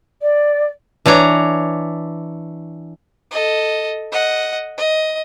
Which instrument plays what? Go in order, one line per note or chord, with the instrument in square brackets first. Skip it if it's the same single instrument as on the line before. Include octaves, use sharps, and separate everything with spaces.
[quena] D5
[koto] E3 D4 C#5 A#5
[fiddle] A4 D#5
D#5 F#5
D#5